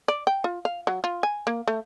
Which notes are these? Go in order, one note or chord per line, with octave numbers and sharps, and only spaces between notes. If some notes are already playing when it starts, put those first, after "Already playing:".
D5
G5
F4
F5
F#3
F4
G#5
A#3
A3